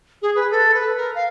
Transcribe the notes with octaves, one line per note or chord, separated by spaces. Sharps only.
G#4
B4
A4
B4
A#4
F5